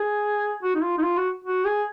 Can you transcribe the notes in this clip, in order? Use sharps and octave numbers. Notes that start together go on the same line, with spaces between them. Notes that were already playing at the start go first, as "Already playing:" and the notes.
Already playing: G#4
F#4
D#4
F4
D#4
F4
F#4
F#4
G#4